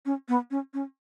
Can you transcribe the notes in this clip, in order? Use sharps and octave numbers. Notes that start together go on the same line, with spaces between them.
C#4
B3
C#4
C#4